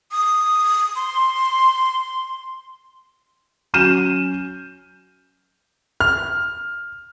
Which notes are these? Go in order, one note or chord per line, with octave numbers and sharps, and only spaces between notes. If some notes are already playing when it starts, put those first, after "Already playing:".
D#6
C6
F#3 C#4 F6 G6 D#7 E7
F6